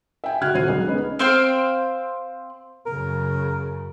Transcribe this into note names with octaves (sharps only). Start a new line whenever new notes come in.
E5 G5 G#5
D3 F#4 F6 F#6 G#6
D#1 C4 F#4 C7 D#7
B1 D3 G#3
G#3 B3 C#4 D#4
C4 C5 F5 G5
F#2 C#3 A#4